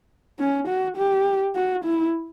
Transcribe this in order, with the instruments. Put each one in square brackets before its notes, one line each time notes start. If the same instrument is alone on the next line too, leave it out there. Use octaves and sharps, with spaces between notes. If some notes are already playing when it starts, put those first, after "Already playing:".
[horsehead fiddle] C#4
F#4
G4
F#4
E4